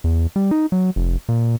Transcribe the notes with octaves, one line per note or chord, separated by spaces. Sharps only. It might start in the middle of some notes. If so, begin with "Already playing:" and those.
E2
G3
D#4
F#3
F1
A#2